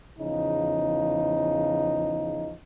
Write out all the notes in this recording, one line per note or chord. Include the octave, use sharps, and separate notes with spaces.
E2 C#3 F3 D#4